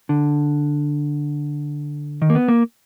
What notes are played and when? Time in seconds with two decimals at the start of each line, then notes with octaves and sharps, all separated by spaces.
0.09 D3
2.22 D#3
2.30 A#3
2.35 B3
2.48 A#3